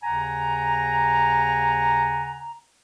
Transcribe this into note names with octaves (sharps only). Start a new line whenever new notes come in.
D#2 C#3 F#5 G#5 A#5